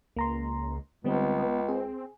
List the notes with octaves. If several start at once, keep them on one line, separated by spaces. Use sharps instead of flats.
C#2 A#3 A#5 C6
C#2 D3 G3 B3 C4
C4 G#4